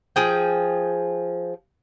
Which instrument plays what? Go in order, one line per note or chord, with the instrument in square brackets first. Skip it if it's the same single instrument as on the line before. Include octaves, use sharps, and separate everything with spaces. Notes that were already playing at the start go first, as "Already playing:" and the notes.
[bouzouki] F3 G#4 G5